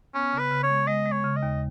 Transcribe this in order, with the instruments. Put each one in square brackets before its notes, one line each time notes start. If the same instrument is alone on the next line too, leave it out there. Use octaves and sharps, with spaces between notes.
[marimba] B3 [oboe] C#4
[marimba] C#3
[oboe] B4
[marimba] C#3
[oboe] C#5
[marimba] G#3
[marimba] G#3 [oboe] D#5
[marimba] G#3
[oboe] C#5
[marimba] C#3
[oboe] D#5
[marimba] D#2